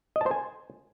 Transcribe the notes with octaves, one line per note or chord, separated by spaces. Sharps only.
D#5
A5
C5
G#5